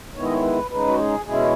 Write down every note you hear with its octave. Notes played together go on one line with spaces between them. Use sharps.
D#3 G#3 B3 E4 C#5
D#5
C#5
B4
C#3 G#3 D#4 B4
F#4
G#4
B2 G#3 C#4 E4 G#4